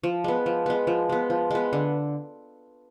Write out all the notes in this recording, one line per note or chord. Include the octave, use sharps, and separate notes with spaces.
F3
G#3 B3
F3
G#3 B3
F3
G#3 B3
F3
G#3 B3
D3